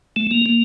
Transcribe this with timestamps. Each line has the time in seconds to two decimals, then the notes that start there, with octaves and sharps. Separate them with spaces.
0.16 A3
0.31 A#3
0.46 A#3